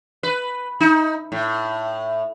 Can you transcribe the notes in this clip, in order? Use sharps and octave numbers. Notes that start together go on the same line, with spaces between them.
B4
D#4
A2